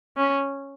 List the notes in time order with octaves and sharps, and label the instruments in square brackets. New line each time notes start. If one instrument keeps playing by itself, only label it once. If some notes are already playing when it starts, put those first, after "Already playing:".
[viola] C#4